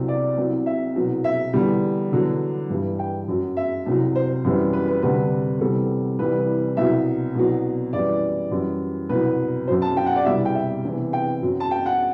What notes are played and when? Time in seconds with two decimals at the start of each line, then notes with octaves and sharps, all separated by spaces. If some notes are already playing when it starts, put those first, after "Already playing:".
Already playing: C2 C3 F#3
0.08 D5
0.37 C2 C3 F#3
0.66 E5
0.96 C2 B2 F#3
1.24 E5
1.53 E2 D3 G3
2.12 E2 D3 F#3
2.70 G2 E3 G3
2.99 G5
3.28 F#2 F#3
3.57 E5
3.86 C2 C3 F#3
4.15 C5
4.45 F#2 E3 G3
4.73 B4
4.88 B4
5.02 D2 C3 G3 B4
5.61 E2 C3 G3 A4
6.19 C2 C3 E3 G3 B4
6.77 C2 B2 F#3 E5
7.35 C2 B2 F#3
7.93 F#2 E3 G3 D5
8.51 F#2 E3 G3
9.09 C2 B2 F#3 B4
9.67 F#3 C5
9.70 F#2
9.82 A5
9.97 G5
10.06 F#5
10.16 D5
10.25 C2 B2 G3 E5
10.45 G5
10.55 E5
10.84 E2 C3 E3
11.13 G5
11.42 F#2 F#3
11.60 A5
11.71 G5
11.86 F#5